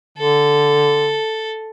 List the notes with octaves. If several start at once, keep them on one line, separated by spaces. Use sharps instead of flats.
D3 A4